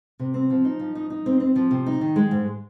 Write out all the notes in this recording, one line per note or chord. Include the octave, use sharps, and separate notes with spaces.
C3
C4
F3
D#4
F3
D#4
D#4
C4
C4
F3
C3
D#4
D#3
G#3
G#2